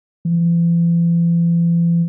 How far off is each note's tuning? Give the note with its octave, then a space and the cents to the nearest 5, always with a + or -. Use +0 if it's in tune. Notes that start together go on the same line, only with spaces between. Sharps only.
E3 +45